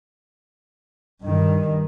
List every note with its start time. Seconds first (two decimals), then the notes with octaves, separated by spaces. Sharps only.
1.22 G2 D#3